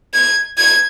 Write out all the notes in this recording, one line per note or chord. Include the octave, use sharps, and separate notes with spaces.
G#6
G#6